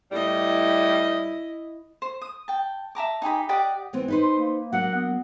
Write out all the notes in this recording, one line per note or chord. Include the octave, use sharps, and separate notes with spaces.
A2 G3 E4 D#5
C5
D#6
G5 A5
E5 A5 A#5 D6
D#4 G4 G#4 B5
G4 D5 D#5 F#5
E3 B3 C4
D#4 B4 C5
C6
A#3
F#3 A#3 D4 F#5
B3